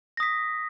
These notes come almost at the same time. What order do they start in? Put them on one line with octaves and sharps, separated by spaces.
A#6 D#6 B6